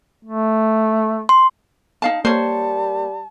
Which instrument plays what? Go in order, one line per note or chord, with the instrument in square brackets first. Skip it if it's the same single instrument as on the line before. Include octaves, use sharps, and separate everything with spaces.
[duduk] A3
[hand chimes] C6
[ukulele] D#4 F5 A5
[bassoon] G3 [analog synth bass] A#3 [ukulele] C5 C#5 [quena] A5